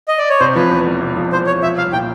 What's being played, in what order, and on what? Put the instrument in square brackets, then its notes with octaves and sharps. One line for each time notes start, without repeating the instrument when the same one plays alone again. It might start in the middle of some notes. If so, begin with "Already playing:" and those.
[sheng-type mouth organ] D#5
D5
C#5
[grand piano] C3 [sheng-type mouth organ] C5
[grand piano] F3 [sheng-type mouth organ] B4
[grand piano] E2
E1
C3
F3
[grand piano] E2 [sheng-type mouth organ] C5
[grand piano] E1 [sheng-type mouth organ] C#5
[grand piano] F3 [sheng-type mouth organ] E5
[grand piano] C2 [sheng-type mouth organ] F5
[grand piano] A#2 [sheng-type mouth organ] G5